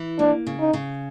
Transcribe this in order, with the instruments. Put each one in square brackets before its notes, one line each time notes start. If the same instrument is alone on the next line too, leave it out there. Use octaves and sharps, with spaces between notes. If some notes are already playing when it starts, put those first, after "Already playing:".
Already playing: [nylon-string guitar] E3
[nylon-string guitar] A#3 [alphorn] D4
[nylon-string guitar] C#3
[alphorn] D#4
[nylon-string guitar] C#3